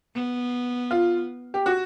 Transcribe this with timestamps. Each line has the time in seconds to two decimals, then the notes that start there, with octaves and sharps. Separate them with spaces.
0.15 B3
0.91 F4
1.54 G4
1.66 F#4